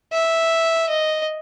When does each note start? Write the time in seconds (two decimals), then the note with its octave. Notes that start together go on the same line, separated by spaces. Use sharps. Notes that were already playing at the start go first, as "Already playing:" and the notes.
0.12 E5
0.89 D#5